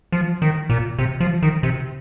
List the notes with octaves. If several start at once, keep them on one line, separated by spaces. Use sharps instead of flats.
F3
D#3
A#2
C3
F3
D#3
C3